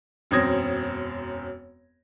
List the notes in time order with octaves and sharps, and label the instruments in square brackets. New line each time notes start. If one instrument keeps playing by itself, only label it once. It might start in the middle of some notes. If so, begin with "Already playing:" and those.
[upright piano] E1 F#2 C4 D#6 G#6 A#6